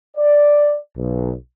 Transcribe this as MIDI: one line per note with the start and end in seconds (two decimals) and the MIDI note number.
0.17 0.77 74
0.97 1.32 35